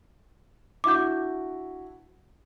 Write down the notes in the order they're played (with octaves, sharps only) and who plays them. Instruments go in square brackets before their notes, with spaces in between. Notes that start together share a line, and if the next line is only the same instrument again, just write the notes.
[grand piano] D4 E4 F#4 [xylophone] D6 G6